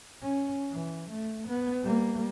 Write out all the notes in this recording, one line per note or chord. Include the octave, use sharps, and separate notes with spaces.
C#4
E3
A3
B3
G3 A#3